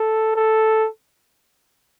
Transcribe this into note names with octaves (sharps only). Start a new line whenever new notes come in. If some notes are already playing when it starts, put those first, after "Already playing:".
Already playing: A4
A4